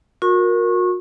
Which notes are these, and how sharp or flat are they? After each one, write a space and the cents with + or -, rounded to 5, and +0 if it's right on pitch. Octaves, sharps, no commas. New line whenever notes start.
F#4 -40 A#4 +0 C#6 -25